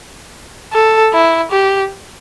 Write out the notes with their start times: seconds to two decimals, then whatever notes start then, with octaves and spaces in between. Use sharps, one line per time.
0.73 A4
1.14 E4
1.52 G4